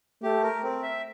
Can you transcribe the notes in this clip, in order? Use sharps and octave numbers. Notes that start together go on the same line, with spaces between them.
A3 G4
A#4
C4
E5